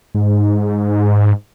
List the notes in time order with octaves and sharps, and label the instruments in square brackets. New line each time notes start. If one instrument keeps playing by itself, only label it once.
[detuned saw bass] G#2